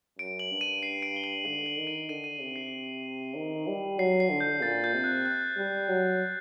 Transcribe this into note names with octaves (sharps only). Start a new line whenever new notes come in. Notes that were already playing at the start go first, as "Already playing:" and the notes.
F#2 D7
F#7
G2
D#7
C7
D7
G7
F#7
D3 F#7
F#7
D#3
D#7
D3 D#7
D#7
C3
C7
D#3
G3
F#3 C7
C7
D3
G6
A#2 A6
G6
C3
F#6
F#6
G3
F#3